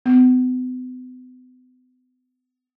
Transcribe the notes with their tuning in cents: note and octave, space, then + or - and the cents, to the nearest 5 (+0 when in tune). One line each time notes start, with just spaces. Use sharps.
B3 +45